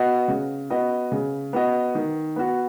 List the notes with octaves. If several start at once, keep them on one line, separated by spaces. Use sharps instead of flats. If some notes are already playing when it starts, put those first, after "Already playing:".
Already playing: B3 F#4 D#5
C#3
B3 F#4 D#5
C#3
B3 F#4 D#5
D#3
B3 F#4